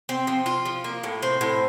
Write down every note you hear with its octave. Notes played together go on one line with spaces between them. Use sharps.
C4
F3
F4
F3
A#3
A2
C4
A2